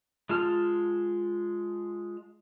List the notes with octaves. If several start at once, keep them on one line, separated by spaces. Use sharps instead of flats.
G#3 F4 A5 F6